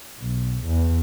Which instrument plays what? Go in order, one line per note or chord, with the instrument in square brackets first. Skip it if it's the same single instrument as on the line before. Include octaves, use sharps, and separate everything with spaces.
[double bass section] B1
E2